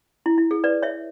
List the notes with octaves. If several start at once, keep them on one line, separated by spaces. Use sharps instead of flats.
E4
E4
G#4
B4 D5
C#5 E5